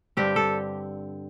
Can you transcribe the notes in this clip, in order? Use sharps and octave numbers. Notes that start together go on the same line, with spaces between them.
G2 D3 C4 G4
A4